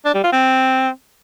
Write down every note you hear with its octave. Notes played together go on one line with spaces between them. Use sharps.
D4
G3
F4
C4